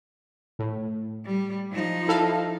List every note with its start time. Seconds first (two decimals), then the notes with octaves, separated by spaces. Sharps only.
0.59 A2
1.25 G3
1.71 F3 D#4
2.08 E4 A4 F5